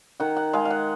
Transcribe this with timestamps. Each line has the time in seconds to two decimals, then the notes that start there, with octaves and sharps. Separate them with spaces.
0.20 D#3 F#5
0.37 F#5
0.53 G#3 F5
0.65 F5
0.70 F#5